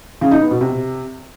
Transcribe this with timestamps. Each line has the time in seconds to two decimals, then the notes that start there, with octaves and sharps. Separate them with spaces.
0.21 C#3
0.31 D#4
0.41 B3
0.51 B2
0.61 C3